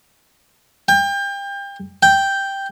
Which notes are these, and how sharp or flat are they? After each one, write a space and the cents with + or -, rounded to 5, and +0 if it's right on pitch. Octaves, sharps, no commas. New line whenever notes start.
G5 +30
G5 +0